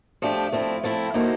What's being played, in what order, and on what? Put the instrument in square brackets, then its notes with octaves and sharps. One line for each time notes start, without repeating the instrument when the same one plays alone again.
[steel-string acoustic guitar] F3 A3 D4 G4
F3 A3 C4 E4
F3 A3 C4 E4
A#3 D#4 F#4 A4 C5